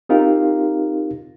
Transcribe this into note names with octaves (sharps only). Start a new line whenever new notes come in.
C4 D#4 F4 G4 A#4 F5